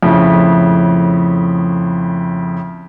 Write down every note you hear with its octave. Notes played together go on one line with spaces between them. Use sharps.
F2 A2 C#3